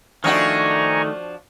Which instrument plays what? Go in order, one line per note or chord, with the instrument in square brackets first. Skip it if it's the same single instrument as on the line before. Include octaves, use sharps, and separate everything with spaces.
[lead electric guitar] D#3 A3 [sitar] F3 D4 F#4 [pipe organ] G#5 A#5 C#6